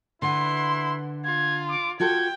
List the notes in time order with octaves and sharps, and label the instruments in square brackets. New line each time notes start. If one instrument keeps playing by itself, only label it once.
[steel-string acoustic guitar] D3 B4 F#5 [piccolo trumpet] E4 [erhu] C6
[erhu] F4 [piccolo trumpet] G#6
[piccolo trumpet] D6
[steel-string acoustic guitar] F4 F#4 A4 [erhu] G5 [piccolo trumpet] G#6